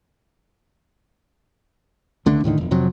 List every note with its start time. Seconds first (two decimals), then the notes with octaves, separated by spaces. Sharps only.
2.26 C#2 D3 A3 D4
2.44 D#2 A2 D3 D#3
2.58 E1 F2
2.71 F2 C3 F#3